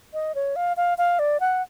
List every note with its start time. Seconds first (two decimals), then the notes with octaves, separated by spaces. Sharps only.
0.13 D#5
0.35 C#5
0.56 F5
0.77 F5
0.98 F5
1.19 D5
1.40 F#5